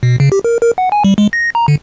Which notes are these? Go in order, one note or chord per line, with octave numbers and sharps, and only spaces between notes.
B2
C#3
G4
A#4
A#4
F#5
G#5
G3
G#3
A#6
A#5
D3